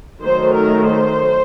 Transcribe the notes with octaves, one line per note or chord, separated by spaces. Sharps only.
D#3 F#3 A3 C5
A#4
C5